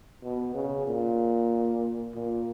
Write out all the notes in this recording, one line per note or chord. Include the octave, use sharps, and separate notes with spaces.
B2
C#3
A#2
A#2